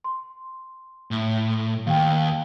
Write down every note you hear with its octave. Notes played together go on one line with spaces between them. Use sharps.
C6
A2
D#2 F5 G5